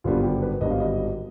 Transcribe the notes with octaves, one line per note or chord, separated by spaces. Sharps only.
G#1 G2 D3 G3 B3 F4
G4
B4
G#1 G2 D3 G3 B3 D#5
F5
D#5